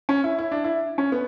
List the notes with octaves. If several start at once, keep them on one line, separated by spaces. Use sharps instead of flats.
C#4
E4
E4
D4
E4
C#4
B3